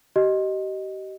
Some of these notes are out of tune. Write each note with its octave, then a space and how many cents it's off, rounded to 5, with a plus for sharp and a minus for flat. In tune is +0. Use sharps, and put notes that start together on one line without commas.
G4 -35 D#5 +0